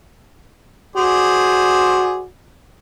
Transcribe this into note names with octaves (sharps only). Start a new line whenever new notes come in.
F#4 G#4 C5 D5